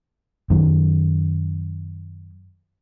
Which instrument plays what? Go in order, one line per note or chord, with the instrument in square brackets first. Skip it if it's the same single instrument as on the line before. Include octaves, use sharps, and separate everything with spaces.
[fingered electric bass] F#2 D#3